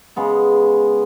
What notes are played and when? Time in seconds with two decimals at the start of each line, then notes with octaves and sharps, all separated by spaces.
0.16 C#3 G#3 B3